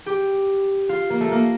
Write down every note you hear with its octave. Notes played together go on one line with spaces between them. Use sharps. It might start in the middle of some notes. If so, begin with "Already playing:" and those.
G4
F4
A#3
A3
A#3